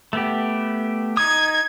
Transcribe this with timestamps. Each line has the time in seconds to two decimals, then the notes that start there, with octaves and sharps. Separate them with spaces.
0.13 A3 B3 G4
1.17 D#4 D#6 G#6